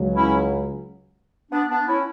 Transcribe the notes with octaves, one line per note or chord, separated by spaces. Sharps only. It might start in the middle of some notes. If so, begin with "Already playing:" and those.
Already playing: C#2 C#3 F#3
C#4 E4
B3 D4
B3 D4
C#4 E4